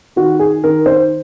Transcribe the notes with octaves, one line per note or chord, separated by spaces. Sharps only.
D#3 F#4
G#4
D#3 A#4
C5